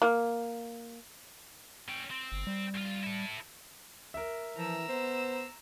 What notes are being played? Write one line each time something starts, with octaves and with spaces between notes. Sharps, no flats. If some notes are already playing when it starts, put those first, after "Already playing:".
A#3
C#4 G5
C4
G1
G3
C2 F4
E4 A4
A#4 E5
E3 F3 A#5 E6
B3 C5